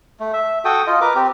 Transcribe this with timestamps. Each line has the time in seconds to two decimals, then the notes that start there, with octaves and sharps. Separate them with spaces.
0.20 A3
0.33 E5
0.65 F#4 A4 G5 D#6
0.87 F4 D#5
1.01 A#4 B4 D6
1.16 C4 G4